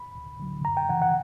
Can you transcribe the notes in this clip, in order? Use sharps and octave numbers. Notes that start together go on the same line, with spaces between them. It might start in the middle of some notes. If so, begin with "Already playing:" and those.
Already playing: B5
D2
D3 F#3
F#2 A#5
G5
C#3 E3 F#5
F#5